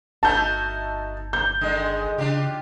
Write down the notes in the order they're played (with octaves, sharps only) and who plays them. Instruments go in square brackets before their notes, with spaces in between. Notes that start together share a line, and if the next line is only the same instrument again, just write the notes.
[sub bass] G1 [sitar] A3 D#4 F#4 [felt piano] A5 G6
[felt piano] G6
[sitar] D3 D#3 G#3
[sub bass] C#3 [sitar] D4 F4 G4